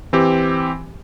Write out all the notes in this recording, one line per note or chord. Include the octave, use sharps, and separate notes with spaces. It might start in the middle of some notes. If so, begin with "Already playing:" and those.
E3 C4 G4